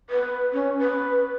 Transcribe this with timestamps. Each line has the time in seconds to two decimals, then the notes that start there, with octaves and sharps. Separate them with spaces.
0.10 B4
0.53 C#4
0.79 B4